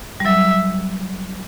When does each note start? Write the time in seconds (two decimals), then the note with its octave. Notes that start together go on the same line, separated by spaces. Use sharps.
0.20 G3
0.25 F#3 E5